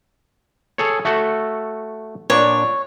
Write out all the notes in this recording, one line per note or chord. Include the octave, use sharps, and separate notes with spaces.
G#4 A4 C#5
A3 F#4 A4
A#2 D4 C#5 A5